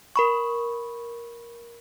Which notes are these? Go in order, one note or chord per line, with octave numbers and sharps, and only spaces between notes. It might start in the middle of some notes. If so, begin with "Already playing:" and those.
A#4 B5 C#6